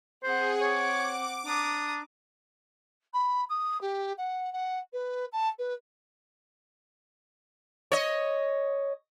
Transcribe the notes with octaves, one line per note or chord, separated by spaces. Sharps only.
C4 G#4 C5 F#5
C#5 D6
D4 A#5 D#6
B5
D#6
G4
F#5
F#5
B4
A5
B4
C#5 D#5